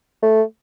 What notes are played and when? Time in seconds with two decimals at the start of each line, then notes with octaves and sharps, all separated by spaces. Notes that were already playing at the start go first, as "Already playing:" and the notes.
0.23 A3